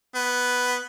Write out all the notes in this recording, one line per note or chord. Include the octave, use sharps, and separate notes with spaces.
B3